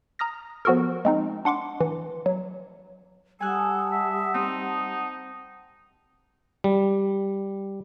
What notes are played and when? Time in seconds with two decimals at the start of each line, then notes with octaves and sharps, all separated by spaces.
0.19 A#5 D#6 F6 A#6
0.65 F3 B3 F#4 A4 A#4
1.05 G#3 C4 D#4
1.45 D4 F#5 C6 D6
1.80 E3
2.26 F#3
3.40 G3 A4 F#5 G#5 A5 D#6 F#6
3.92 E5
4.34 C4 D#4
6.64 G3